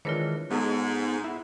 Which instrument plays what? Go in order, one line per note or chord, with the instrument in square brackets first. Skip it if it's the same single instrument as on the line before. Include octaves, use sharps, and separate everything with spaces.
[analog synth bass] D#3 [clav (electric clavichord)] E3 G#3 D4 [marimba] F4 A#4 C#5
[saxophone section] G#2 [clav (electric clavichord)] G#3 F#4 A4 [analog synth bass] B3
[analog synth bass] E4 [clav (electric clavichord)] E5 F#5